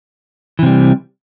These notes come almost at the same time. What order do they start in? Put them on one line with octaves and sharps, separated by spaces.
E3 C3 G3